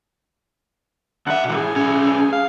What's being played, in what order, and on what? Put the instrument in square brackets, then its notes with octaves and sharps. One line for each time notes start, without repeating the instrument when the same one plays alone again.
[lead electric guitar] D2 E5 [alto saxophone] F#5
[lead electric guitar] B2 E3
[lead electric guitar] A2 [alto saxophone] G#4
[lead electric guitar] B1 C#4
[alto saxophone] F5